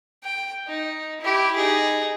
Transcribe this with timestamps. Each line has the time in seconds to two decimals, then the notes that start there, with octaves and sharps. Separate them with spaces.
0.23 G5
0.68 D#4
1.21 E4 G4
1.56 D#4 G#4